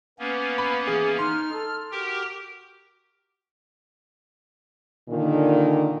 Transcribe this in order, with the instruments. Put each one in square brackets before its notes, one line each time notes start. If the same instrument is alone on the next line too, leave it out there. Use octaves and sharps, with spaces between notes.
[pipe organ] A#3 B3 C#4 [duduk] B4
[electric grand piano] B5
[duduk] E3 [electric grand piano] G#4
[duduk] D#4 [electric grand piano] C6 [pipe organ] F6
[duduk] A4
[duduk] F#4 [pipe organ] G4 A#4 G5
[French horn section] A#2 D3 D#3